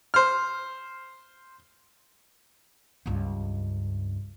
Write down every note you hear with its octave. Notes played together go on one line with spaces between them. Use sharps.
C5 F6
C#2 G2